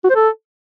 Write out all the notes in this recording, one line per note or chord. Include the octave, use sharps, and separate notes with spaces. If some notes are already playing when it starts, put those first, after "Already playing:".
F#4
C5
A4